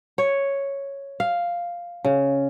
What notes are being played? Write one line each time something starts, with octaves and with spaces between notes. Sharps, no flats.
C#5
F5
C#3